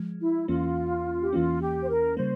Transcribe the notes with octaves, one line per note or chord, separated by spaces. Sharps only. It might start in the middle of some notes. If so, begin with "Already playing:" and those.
Already playing: F3 G#3
E4
E2 E3 A#3 C#4 F4
G4
E2 E3 A#3 C#4 F4
G4
C5
A#4
C#3 G3 A#3 C5